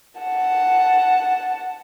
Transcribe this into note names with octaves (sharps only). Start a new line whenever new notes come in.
F#5 A5